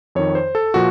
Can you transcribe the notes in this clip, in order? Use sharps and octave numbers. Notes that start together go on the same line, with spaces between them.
F2 D#3 C#5
C5
A4
A#2 F3 F#4